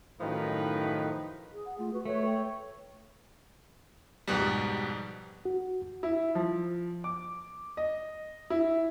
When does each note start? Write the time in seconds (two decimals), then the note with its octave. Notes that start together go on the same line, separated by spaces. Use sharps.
0.21 F#2 A2 D#3 F3 D#4 B4
1.52 G#4
1.66 F#5
1.79 A3 F4
1.93 F#4 B4
2.05 A3 B4 C#5
2.25 G5
4.28 F2 G#2 B2 G3
5.45 F#4
6.03 E4
6.35 F3
7.04 D6
7.77 D#5
8.50 E4